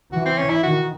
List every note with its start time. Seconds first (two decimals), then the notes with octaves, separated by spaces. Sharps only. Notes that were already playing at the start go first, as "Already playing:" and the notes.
0.12 E3 F#4
0.25 C4
0.38 C#4
0.50 E4
0.63 D#3 F#4